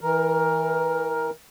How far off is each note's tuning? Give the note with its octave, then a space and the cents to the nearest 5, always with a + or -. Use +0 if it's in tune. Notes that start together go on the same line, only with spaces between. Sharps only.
E3 -25 A#4 +10